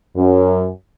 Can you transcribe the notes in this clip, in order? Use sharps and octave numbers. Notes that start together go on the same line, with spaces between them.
F#2